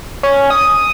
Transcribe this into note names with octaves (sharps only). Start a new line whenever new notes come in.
C#4
D#6